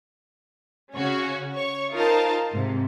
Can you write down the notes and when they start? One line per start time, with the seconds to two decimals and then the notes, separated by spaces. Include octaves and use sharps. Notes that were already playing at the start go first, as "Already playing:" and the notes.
0.97 C#3 C#4 F#4 C#5
1.56 C#5 C#6
1.93 D#4 F4 A#4 C5 F5 A5
2.52 G#2 C3